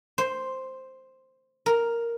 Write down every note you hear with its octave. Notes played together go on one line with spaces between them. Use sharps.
C5
A#4